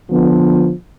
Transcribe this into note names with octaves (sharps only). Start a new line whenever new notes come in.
D3 F3 B3